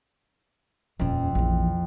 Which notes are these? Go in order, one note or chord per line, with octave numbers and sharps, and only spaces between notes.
D#1 F2 C#4
A#1 E3